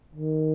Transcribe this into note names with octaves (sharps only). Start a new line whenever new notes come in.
D#3